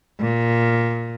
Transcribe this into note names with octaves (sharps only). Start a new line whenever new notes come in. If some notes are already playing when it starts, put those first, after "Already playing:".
A#2